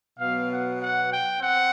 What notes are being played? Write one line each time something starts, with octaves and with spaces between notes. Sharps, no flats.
B2 F#3 B3 F5
F#5
F#5
G5
C4 F#5